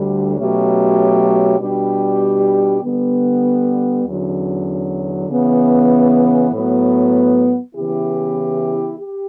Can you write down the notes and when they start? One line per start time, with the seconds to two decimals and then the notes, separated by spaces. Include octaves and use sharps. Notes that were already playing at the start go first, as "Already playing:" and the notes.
Already playing: D2 D3 G3
0.36 B2 F#3 A3 C#4 G4
1.59 B2 G3 D4 G4
2.83 D3 G3 B3
4.05 E2 D3 F#3 C#4
5.29 C#3 E3 B3
6.51 A2 F#3 B3
7.75 C#3 E3 B3 E4 G4
8.98 G4